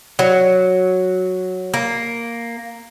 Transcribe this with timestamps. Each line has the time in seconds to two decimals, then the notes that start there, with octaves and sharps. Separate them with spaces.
0.19 F#3
1.74 A#3